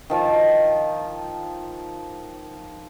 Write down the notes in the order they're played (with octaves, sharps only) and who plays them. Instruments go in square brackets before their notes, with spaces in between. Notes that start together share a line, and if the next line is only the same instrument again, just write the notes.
[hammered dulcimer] D#3 F3 A5